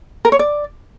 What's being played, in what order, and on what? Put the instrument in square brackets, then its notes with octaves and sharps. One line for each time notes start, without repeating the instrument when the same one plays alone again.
[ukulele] A#4
C#5
D5